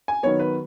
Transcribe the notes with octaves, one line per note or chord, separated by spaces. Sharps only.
G#5
D#3 F#3 B3 C#5
B4